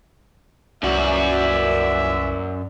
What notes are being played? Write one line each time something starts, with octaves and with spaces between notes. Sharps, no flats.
C2 F#2 A#2 E3 F#4 D5 E5